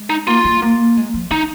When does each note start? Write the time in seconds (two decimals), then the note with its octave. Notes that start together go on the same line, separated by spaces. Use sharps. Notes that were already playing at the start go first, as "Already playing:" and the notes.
Already playing: G#3
0.10 D#4
0.27 A#3 F4
0.44 G#3
0.62 A#3
0.97 G#3
1.14 F3
1.31 D#3 D#4